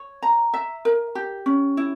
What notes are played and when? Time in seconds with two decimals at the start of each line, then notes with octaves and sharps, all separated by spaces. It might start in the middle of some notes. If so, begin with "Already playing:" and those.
Already playing: C#5
0.23 A#5
0.54 E5
0.85 A#4
1.15 G4
1.46 C#4
1.77 E4